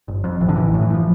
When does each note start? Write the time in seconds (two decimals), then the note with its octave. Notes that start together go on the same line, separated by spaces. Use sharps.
0.08 G1
0.24 F2
0.41 A1 E3
0.49 D3
0.56 A1 E3
0.74 A2
0.81 E3
0.90 A2 F3